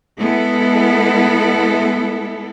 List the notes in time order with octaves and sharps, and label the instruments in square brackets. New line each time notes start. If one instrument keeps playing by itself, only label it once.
[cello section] G#3 B3 E4 A4